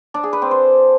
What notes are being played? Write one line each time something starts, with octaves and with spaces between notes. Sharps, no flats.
D4
G#4
B4
C4
C5